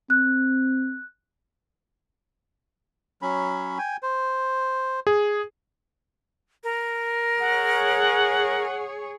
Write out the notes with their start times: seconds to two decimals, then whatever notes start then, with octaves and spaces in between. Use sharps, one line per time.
0.10 C4 F#6
3.22 F#3 C#4 B5
3.78 G5 G#5
4.03 C5
5.07 G#4
6.64 A#4
7.40 G#4 C#5 F#5